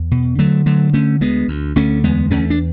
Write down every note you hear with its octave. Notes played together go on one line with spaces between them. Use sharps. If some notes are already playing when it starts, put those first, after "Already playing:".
Already playing: E2
B2
D3 F#3 A3
D3 F#3 A3
D3 A3 C#4
D2 G#3 B3
D2
D2 A3 C#4
E2 G#3 B3
E2 A3 C#4
D4